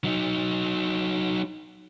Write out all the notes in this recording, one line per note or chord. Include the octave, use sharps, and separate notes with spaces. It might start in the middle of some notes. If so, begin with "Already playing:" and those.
F#3 D#4